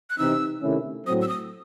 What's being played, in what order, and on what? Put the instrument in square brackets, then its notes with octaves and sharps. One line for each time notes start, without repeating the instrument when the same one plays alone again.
[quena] F#6
[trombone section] C3 E3 C4 D#4 [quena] E6
[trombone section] C3 D#3 A3 C#4 E4
[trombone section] A2 F#3 C4 [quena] D#6
[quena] E6
D#6